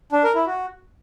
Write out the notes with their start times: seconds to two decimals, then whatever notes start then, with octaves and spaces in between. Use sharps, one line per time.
0.12 D4
0.24 A#4
0.35 E4
0.47 F#4